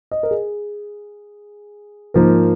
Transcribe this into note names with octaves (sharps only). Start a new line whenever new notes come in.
D#5
A#4
G#4
G#2 F3 A#3 A#4